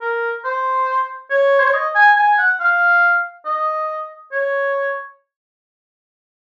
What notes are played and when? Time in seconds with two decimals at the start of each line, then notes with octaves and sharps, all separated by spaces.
0.02 A#4
0.45 C5
1.30 C#5
1.60 C5
1.67 C#5
1.74 D#5
1.95 G#5
2.17 G#5
2.38 F#5
2.60 F5
3.46 D#5
4.32 C#5